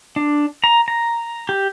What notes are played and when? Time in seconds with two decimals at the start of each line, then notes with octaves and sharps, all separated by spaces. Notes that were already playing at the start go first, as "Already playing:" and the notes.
0.16 D4
0.64 A#5
0.88 A#5
1.49 G4